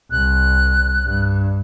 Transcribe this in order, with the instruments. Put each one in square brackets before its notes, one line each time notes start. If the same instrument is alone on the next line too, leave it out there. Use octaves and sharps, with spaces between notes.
[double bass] C2 [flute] F#6
[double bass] G2